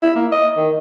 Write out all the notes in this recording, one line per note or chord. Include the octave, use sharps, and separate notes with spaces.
E4
A#3
D#5
D#3